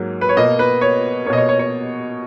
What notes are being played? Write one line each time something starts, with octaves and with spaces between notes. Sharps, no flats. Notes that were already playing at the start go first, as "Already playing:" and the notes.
Already playing: G#2 F#3 A#3
B4
C#5
B2 A#3 D#5
B4
C#5
B2 A#3 C#5 D#5
C#5
C#5
C#5